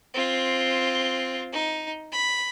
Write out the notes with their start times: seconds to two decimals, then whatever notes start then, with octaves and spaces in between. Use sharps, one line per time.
0.14 C4 F4
1.53 D#4
2.12 B5